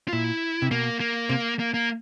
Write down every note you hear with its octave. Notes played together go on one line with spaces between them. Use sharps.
F4
A#2 E4
C3
B2 A#3
A#3
C3
A#3
A#3